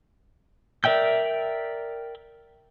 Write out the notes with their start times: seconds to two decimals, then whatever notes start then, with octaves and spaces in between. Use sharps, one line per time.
0.84 A#4 D5 E5 G5 G6